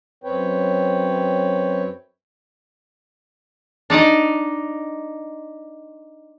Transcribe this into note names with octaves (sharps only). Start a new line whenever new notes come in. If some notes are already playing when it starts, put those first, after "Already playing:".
F#2 C4 B4 C#5 G5
D4 D#4 D5 D#5